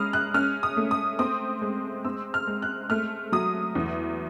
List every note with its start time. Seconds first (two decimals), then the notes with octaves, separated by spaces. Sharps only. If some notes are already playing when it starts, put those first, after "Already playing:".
Already playing: G#3 C#4 B5 D#6 F6
0.13 F#6
0.34 C#4 F6
0.63 D#6
0.77 A3
0.91 D#6
1.19 C4 D#6
1.62 G#3
2.05 C4 E6
2.34 F6
2.47 G#3
2.62 F#6
2.90 A3 F6
3.32 F#3 D#6
3.75 E2